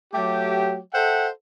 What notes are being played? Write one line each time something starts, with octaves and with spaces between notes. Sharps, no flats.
F#3 A3 G4
A4 C5 E5 F#5 G5